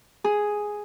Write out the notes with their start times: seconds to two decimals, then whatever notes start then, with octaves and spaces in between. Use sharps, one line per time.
0.24 G#4